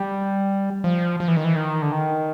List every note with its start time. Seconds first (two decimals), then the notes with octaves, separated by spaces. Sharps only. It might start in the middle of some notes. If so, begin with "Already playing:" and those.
Already playing: G3
0.84 F3
1.20 F3
1.28 E3
1.36 D#3
1.44 E3
1.56 D#3
1.82 D3
1.92 D#3